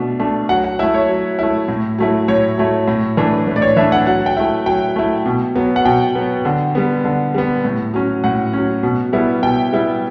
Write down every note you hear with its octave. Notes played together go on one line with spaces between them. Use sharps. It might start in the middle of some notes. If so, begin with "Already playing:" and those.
Already playing: B2 A3 D4
A3 D4
F#3 F#5
F#5
A3 E4 E5
C#5
F#3
A3 E4
A2
F#3 A3 E4
A2 C#5
F#3 A3 E4
A2
E3 A3 D4
A2 B4
D5
C#5
E3 A3 D4 E5
F#5
F#3 F#5
G5
A3 E4
F#3 G5
A3 E4
B2
F#3 B3
F#5
B2 G5
F#3 B3
D3
G3 B3
D3
G3 B3
A2
F#3 C#4
A2 F#5
F#3 C#4
B2
G3 B3 E4
B2 G5
G3 B3 E4